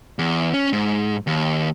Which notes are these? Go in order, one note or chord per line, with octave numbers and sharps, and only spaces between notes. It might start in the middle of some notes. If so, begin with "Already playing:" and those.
E2
C#4
G#2
D#2